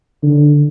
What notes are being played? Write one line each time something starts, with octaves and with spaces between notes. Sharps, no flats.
D3